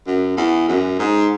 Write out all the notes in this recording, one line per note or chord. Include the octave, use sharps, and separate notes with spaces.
F#2
E2
F#2
G#2